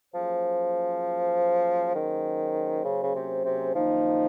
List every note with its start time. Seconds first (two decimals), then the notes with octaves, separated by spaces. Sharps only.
0.14 F3 F#3 A#3 C#4 G#4 C5
1.95 D#3
2.84 C#3
3.03 C#3
3.15 C3
3.45 C3
3.75 F#2 D#3 F3 A#3 D#4